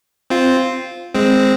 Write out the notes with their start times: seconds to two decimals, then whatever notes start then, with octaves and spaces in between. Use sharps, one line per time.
0.30 C4 F4
1.14 G#3 C4